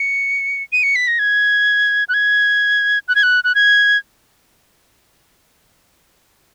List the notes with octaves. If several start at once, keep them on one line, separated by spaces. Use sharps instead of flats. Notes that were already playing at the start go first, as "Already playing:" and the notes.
Already playing: C#7
D#7
C#7
B6
A#6
G#6
F#6
G#6
F#6
G#6
F#6
F#6
G#6